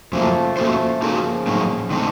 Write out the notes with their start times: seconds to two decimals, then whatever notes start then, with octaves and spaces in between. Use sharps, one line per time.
0.13 F2 C#3 F3 F#3 A3 A#3
0.57 F3 A3 A#3 C#4 F#4 C5
1.01 C#3 F3 A#3 D#4 F#4 A#4
1.47 A2 F#3 A#3 D#4
1.90 D#3 A3 C4 D#4 A4